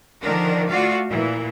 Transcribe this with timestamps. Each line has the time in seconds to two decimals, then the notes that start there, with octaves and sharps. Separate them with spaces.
0.23 D3 D#3 F3 D4 A#4
0.69 A3 F4 F#4 D5 F5
1.08 A#2 E3